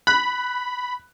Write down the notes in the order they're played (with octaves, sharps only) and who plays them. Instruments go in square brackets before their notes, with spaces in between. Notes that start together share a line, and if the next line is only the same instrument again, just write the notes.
[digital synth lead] B5 [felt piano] F#6